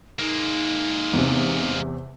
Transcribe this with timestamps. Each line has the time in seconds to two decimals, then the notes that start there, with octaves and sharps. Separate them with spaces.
0.19 G#3 A#3 D#4
1.14 E2 C3